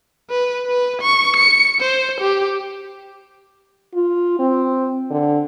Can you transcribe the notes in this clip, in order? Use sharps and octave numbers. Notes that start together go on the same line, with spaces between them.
B4
B4
C#6
C#7
C5
G4
F4
C4
D3